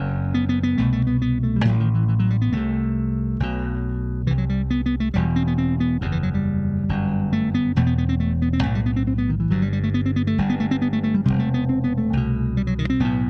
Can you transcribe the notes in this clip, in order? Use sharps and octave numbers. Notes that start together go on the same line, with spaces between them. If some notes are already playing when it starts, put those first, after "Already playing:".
Already playing: F#1 F#2 C4
B3
B3
B3
C2 B2 A3
A3
B3
B3
A3
G3
A1 A2 F#3
D#3
E3
E3
F#3
G3
B3
C2 C3 A3
B1 B2
C2 C3 E3
F#3
G3
B3
B3
A3
E1 E2 B2 G3
C4
B3
C4
B3
F#1 E2 C3
E3
F#3
G3
G1 F#2
A3
B3
E1 E2 B2 A3
B3
B3
C4
A3
B3
C4
B1 A2 A3
G3
B3
C4
C4
B3
D#3
E3
G1 G2 F#3
G3
G3
A3
B3
C4
B3
A3
G1 G2 G3
B3
A3
C4
B3
A3
A3
G3
E1 E2 C3 G3
A3
B3
C4
B3
A3
C2 B2
G3
F#3
D#3
C4
B1 A2 B3